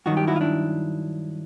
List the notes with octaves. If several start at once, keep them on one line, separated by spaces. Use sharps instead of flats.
G2 D#3 F#3 F#4
G4
E4 F#4
F4
D4 E4